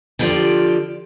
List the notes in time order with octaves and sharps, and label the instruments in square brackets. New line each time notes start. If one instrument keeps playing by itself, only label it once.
[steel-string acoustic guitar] D3 F3 F4 G4 D5